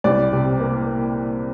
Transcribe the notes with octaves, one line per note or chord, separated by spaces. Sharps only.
C2 D5
C3
A#3